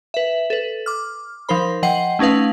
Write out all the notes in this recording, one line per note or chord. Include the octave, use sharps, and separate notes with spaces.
B4 E5
A4 B4
D6 F6
F3 D#4 A#4 C5 B5
F3 D#5 F#5 G5 C7
A3 C#4 D#4 B4 F5